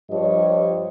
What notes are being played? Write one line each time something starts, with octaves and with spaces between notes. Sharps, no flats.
G2 F3 G4 C#5 D#5